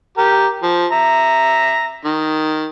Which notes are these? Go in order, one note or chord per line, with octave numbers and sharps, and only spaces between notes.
G4 A#4
F3
E5 A#5
D#3